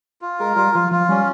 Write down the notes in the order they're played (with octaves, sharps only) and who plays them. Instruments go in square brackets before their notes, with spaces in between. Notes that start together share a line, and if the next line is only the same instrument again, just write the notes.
[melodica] F4
[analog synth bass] G#3 [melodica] A#4
[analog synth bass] G3 [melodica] F4
[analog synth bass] F3 [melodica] F4
[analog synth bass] F3 [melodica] F4
[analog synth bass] G3 [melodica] C#4